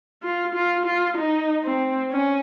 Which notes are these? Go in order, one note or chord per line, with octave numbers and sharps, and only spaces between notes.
F4
F4
F4
D#4
C4
C#4